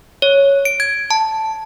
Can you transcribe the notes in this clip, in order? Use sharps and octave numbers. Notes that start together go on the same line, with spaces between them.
C#5
D7
G#6
A5